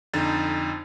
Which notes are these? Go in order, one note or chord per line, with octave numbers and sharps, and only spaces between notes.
F2 D3 D#4 A6